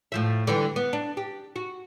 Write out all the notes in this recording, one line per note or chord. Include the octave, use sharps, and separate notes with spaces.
A2 F3 E5
D3 E3 G3
B3
D4
G4
F#4